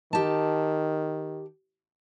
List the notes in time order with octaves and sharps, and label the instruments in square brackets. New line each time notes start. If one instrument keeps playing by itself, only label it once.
[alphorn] D#3 [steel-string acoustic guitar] G4 A5